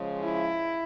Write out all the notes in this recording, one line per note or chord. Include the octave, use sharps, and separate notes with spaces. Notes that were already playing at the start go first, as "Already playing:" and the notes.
Already playing: C#3 F3 G#3
E4